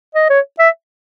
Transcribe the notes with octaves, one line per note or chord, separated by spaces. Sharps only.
D#5
C#5
E5